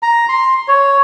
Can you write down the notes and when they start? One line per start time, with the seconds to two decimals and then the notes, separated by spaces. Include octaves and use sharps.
0.03 A#5
0.29 C6
0.68 C#5